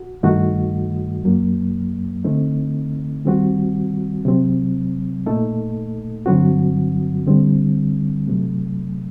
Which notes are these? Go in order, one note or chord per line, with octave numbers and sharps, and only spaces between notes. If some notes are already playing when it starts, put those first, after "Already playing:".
Already playing: F#4
G2 D#3 A3 D#4 F#4
F#2 F#3 A#3
D3 A3 C4 D#4
D#3 G3 C4 F#4
C3 F#3 C4
A#2 A3 D#4 A4
G2 D3 F#3 C4 F#4
D3 G3 C4
C3 F#3 A3